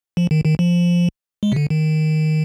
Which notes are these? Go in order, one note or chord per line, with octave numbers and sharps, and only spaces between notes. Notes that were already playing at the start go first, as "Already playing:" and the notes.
F3
D#3
D#3
F3
G#3
C3
D3
D#3